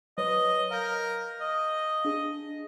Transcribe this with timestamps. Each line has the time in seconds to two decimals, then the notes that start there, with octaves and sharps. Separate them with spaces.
0.18 F#3 B4 C#5 D#5
0.71 A#4 F5 G6
1.41 D#5
2.05 D4 G#4